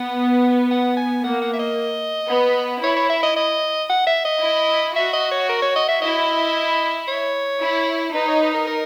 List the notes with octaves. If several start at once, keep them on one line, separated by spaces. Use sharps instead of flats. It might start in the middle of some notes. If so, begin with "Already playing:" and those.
Already playing: B3 F#5
F#5
G#5
A#3 F#5
F#5
E5
D#5
B3
E4 C#5
C#5
E5
D#5
D#5
F#5
E5
D#5
E4
F#4 E5
D#5
C#5
A#4
C#5
D#5
E5
E4 D#5
C#5
E4
D#4 B4
C#5
B4
A#4
A#4